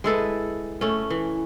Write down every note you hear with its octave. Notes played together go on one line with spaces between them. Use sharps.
G#3 E4 A4 B4
A3 C#4
E3